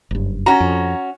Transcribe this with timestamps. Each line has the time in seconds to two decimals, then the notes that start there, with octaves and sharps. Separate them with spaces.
0.11 F#1 G2
0.46 C#4 F#4 A#5
0.60 F2